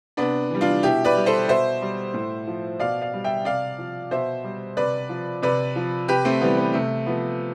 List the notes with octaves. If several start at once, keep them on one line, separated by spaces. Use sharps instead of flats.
C3 B3 D4
E3 G3
D4 F4
B2 E4 G4
B4 D5
G3
A4 C5
B2 C5 E5
G3
A2
F3
B2 D5 F5
D5 F5
G3
E5 G5
C3 D5 F5
F3
B2 C5 E5
G3
C3 B4 D5
F3
C3 B4 D5
F3
C3 G4 B4
A3 C4
E3 G3 B3
B3
C3 A3
F3 B3